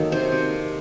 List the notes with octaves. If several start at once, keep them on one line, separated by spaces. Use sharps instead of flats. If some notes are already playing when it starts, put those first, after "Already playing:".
Already playing: D#3 F#3 A#3 F#4 A4
C3 C5
C3